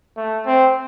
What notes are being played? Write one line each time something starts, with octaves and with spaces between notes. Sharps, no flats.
A3
C4